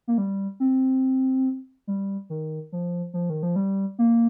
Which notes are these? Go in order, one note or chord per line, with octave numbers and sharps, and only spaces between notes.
A#3
G3
C4
G3
D#3
F3
F3
D#3
F3
G3
A#3